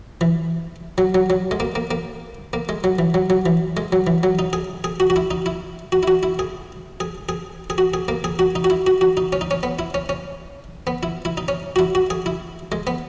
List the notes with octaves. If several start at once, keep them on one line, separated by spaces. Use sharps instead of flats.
E3
F#3
F#3
F#3
G#3
A#3
A#3
A#3
A#3
G#3
F#3
E3
F#3
F#3
E3
G#3
F#3
E3
F#3
D#4
G#4
G#4
F#4
F#4
E4
D#4
E4
F#4
E4
F#4
E4
G#4
G#4
G#4
G#4
F#4
G#4
A#3
G#4
F#4
D#4
F#4
E4
F#4
F#4
D#4
C#4
D#4
C#4
B3
E4
C#4
C#4
B3
E4
E4
D#4
C#4
F#4
E4
F#4
G#4
E4
G#3
B3